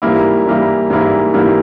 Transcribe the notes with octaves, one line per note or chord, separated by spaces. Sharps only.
G#2 E3 G3 A#3 E4
G#2 E3 G3 A#3 E4
G#2 E3 G3 A#3 E4
G#2 E3 G3 A#3 E4